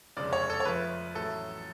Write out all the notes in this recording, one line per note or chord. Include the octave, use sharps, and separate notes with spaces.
F1 F2 C#3 G#3 D5
C#5
A4
C#5
F2 F3 A3 B4
A1 A2 F#3 A3 A4